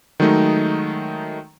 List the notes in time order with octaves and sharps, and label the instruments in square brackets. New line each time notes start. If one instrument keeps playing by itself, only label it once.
[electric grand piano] D#3 F#3 G#3 A3 D#4